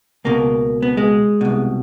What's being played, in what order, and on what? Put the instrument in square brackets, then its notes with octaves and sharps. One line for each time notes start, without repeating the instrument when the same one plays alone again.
[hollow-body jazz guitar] C#2 B2 A#3
B3
G#3
C2 B2